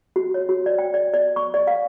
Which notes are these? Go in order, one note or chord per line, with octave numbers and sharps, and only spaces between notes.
F#4
C#5
F#4
D5
G5
D5
D5
C#6
D5
F5